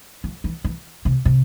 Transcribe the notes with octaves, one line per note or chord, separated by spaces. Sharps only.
F3
E3
E3
C3
C3